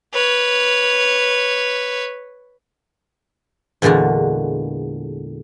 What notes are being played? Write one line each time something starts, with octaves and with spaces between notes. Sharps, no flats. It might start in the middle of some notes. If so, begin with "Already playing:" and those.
B4 C#5
E2 A#2 D3 G#3 F#4